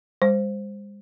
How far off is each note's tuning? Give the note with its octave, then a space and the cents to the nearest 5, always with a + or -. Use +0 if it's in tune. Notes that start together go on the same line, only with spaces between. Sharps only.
G#3 -45 C5 +0